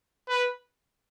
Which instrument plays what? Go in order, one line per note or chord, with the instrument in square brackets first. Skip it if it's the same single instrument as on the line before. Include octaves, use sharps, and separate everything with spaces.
[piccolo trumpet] B4